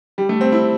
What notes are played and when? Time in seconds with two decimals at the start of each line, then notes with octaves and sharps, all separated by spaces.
0.18 G3
0.29 A3
0.41 C4
0.52 E4